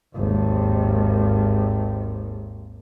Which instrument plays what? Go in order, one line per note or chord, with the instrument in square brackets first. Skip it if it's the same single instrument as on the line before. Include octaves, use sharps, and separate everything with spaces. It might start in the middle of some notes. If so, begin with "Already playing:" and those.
[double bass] G#1 D#2